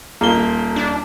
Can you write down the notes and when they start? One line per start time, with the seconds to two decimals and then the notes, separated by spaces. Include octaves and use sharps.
0.21 D#1 A#3 F4 A4 D#5 A5 G7
0.76 D4